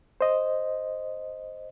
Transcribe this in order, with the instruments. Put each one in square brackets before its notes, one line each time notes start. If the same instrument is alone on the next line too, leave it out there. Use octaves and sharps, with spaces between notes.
[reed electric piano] C5 D#5